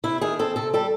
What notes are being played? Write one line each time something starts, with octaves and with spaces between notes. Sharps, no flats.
C3 E4
D#3 G#4
C4 A4
C3 A4
G3 A4